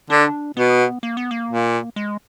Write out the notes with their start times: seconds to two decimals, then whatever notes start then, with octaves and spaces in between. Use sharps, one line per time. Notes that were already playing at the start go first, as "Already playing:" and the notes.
0.10 D3 D4
0.57 B2 B3
1.03 A#3
1.17 B3
1.31 A#3
1.51 A#2
1.96 G#3